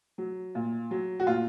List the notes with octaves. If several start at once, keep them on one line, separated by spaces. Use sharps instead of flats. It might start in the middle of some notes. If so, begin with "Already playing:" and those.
F#3
A#2
F#3
F#4
A#2 F4